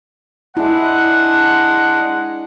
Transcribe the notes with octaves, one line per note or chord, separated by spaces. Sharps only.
G#3 D4 E4 F#5